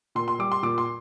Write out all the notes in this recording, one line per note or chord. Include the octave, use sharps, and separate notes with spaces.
A#2 C6
C6
G3 D6
C6
A#2 D6
C6